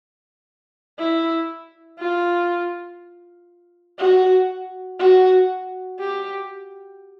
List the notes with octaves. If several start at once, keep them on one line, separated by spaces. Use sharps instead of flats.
E4
F4
F#4
F#4
G4